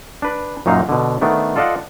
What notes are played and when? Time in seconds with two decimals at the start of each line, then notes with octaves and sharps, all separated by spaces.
0.22 D4 B4
0.66 F#2 A#2 F#3 D#4 F5 A#5
0.89 B2 D3
1.21 D#3 A3 B3 D4
1.56 F4 A4 D5 D#5 F5 F#5